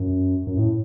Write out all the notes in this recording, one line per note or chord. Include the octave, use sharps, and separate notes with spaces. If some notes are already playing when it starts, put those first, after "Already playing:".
Already playing: F#2
F#2
A2